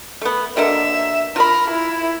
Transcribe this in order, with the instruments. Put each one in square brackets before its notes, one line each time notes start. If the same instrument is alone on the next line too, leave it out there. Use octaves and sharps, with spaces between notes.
[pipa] A3 B3
[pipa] B2 D3 A#3 [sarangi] E5
[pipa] F4 B5 [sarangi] A#4
[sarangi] E4